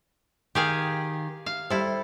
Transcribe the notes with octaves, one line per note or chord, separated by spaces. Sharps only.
D#3 G4 G#4 F5
F5
G3 E4 G4 A4 C5